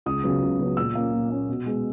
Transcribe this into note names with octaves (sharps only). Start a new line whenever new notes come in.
C#2 D#6
C#3 F#3 B3
C#2
C#3 F#3 B3
A#2 E6
A#3 C#4
A#2
A#3 C#4
B2
G#3 B3